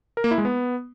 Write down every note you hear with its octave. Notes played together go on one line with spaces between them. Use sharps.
A#4
A#3
E4
G#3
B3